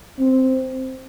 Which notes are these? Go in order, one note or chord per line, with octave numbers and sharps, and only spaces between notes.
C4